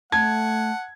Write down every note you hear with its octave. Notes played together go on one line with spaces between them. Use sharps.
A3 F#5 A5 G#6